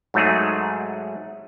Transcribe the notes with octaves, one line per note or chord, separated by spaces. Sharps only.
G#2 F#3 A3 D#4 G#4